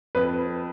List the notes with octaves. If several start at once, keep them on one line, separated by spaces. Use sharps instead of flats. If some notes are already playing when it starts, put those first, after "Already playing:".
F2 B4